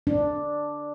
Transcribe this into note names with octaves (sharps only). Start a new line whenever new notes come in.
D4